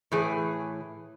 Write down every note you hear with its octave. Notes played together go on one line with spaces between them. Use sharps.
A2 E3 G#4